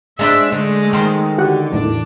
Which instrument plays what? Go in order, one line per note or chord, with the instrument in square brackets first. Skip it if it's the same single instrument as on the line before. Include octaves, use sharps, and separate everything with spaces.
[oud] G#3 D4 C5 [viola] E5
[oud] D3 [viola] G#3 A3
[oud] D#3 C5
[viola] D3 [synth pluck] F#4 G4 F#5
[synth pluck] E2 A2 [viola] D4